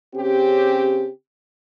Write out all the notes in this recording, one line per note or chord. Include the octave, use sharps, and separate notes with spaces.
C#3 C4 C#4 G4